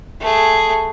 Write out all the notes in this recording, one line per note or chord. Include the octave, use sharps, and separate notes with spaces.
A3 G#4